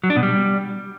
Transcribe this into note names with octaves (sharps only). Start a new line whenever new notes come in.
F#3
D4
B2
G3